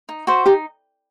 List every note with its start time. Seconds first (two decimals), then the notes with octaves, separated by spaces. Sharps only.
0.09 D#4
0.27 F#4 C5 E5
0.46 D#4 G4